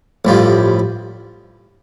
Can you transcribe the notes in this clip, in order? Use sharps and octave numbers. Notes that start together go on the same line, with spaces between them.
A1 G2 F3